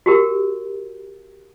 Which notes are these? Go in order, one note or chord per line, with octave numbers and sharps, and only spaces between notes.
F#4 G4 A#4